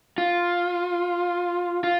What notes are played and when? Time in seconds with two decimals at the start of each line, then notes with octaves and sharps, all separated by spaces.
0.18 F4
1.84 F4